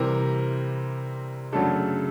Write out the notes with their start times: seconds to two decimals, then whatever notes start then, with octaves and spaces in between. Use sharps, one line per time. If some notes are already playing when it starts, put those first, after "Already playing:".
Already playing: C3 E3 G3 C4 A#4
1.53 F#2 C#3 F#3 A3 D4 A4